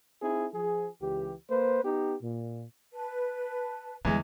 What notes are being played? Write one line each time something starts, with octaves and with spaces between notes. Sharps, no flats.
C4 D#4 E4 G#4
F3 G#4
C#2 E3 G4
A#3 B4 C5
B3 D#4 G4
A#2
B4 A5
E2 D3 G3 G#3 G#5